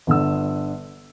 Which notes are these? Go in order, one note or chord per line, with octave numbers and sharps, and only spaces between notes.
G1 D3 E6